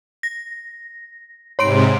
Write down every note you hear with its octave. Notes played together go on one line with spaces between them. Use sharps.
A#6
G#2 C3 C#5 C6 D7